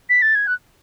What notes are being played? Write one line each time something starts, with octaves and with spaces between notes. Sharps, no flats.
B6
A6
G#6
F#6